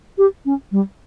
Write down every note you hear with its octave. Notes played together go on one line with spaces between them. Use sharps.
G4
C#4
G3